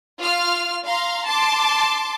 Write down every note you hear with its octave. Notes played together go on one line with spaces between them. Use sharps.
F4 F5 F6
F5 A#5 C6
A5 C6 D6